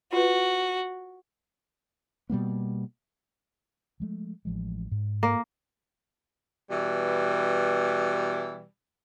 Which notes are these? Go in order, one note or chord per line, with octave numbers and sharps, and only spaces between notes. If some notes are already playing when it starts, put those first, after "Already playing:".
F4 F#4 B4
B2 G3 A#3 B3
F3 G#3 A3
A1 F3 G#3
G#2
A#3
B2 E3 G3